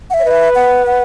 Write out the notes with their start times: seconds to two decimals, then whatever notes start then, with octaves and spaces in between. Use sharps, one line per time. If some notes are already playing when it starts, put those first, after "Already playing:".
0.10 F#5
0.14 E5
0.20 C#5
0.25 B4 D#5
0.31 E5
0.55 F#5
0.87 F#5